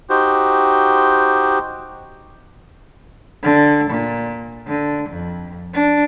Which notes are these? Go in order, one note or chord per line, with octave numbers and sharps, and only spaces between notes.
D#4 F#4 G4 C5
D3
A#2
D3
F2
D4